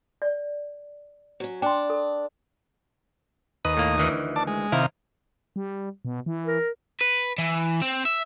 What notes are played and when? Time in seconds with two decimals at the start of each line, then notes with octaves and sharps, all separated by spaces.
0.22 D5
1.40 F#3 C#4
1.62 D4 G5 C6
1.90 A4
3.65 D#2 B4 D#5
3.77 A2 A#3
3.98 D2 D#3 E3
4.36 D5 A5
4.47 G#3
4.72 C3 D#3 E4 F5
5.56 G3
6.05 B2
6.26 E3
6.46 A#4
7.01 B4
7.38 E3
7.82 C4
8.05 E5